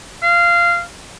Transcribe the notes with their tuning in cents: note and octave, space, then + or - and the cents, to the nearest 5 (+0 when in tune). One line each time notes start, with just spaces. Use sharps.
F5 -15